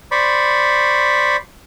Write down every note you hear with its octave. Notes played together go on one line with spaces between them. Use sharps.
C5 D5 B5 C#6